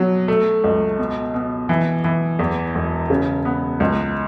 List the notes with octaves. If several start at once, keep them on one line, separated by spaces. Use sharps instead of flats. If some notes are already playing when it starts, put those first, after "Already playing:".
Already playing: B2 F#3
A3
C#2
B2
B2
E3
E3
E2
E1
C#3
B3
C#2